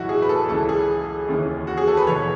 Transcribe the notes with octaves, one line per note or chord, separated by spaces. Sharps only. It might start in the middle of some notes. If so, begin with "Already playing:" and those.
Already playing: B1 A2 E3 E4 F#4
G#4
B4
A4
C#2 C#3 E3 A4
G#4
D#2 C#3 E3
F#4
G#4
A4
B4
E1 E2 B2 C#5